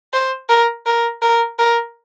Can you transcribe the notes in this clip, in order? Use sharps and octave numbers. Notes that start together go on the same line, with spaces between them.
C5
A#4
A#4
A#4
A#4